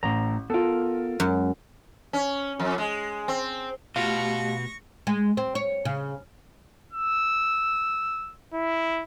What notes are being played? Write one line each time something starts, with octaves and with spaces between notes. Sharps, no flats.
A1 A2 A#5
B3 F4 A4 A#4
F#2 G#3
C#4
F2
G#3
C4
B2 A3 F4 G4 C#6 A#6
G#3
C4
C#5
C#3
E6
E4